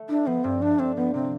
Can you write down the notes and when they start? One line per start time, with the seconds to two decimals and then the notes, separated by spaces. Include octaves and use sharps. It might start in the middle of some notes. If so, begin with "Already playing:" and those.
Already playing: A3
0.09 D4 E4
0.26 F3 B3
0.44 G2 C4
0.62 A3 D4
0.79 C4 D4
0.96 F3 B3
1.14 C3 C4